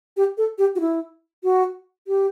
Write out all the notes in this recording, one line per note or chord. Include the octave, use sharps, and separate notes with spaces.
G4
A4
G4
F#4
E4
F#4
G4